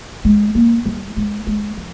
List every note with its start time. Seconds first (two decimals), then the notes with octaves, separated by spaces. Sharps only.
0.25 G#3
0.55 A#3
0.86 G3
1.16 G#3
1.47 G#3
1.77 F3